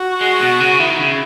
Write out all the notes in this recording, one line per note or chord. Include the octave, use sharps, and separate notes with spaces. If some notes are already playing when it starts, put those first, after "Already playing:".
Already playing: F#4
G#3
B2
C#3
D#3 E4
C#3